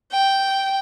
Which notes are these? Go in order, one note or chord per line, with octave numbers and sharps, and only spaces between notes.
G5